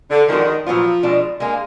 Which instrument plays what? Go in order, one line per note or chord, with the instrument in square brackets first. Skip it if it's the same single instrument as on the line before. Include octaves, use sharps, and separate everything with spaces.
[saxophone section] D3
[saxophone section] D#3 [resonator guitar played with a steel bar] F3 G#3 D4 F#4
[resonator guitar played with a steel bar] A#2 F#3 B3 F4 [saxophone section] F3
[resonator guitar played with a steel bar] B2 G#3 D4
[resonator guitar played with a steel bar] G#3 D4 G#4 [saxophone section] A#3